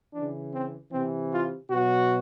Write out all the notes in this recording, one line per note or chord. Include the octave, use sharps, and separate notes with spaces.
C#3 E3 D4
C4
C3 E3 C4
F4
B2 F#3 F#4